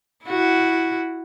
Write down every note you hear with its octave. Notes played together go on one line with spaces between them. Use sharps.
E4 F#4